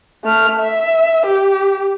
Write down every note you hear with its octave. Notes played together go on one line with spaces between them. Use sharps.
A3 F6
E5
G4